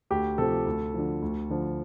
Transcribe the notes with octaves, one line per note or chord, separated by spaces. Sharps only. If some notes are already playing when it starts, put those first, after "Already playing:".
D2 G4
C3 F3 A4
D2
D3 F3
D2
D3 F3